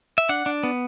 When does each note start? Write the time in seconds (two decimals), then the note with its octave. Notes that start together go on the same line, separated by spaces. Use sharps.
0.18 E5
0.29 D4 F#5
0.46 D4
0.63 B3